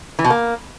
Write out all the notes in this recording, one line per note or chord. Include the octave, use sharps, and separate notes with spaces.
E3
B2
A#3